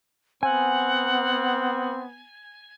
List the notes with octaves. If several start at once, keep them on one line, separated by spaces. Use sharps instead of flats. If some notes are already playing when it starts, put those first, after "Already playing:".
B3 C4 F#5 G#5